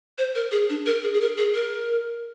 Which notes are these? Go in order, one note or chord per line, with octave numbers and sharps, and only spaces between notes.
C5
A#4
G#4
D4
A#4
G#4
G#4
A#4
G#4
A#4